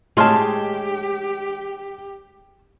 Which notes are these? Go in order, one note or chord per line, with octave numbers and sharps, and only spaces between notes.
A2 G#3 G4 G#4 C#5 A5 C6 F6